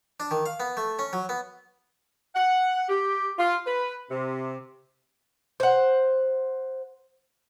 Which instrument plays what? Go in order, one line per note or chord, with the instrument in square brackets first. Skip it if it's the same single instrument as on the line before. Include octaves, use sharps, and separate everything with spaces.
[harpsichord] D4
D#3
F5
B3
A3
C#4
F#3
B3
[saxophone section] F#5
G4
F4
B4
C3
[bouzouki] C5 F#5